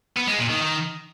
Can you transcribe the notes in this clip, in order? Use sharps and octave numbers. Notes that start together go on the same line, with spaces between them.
B3
G#3
A#2
D#3
D#3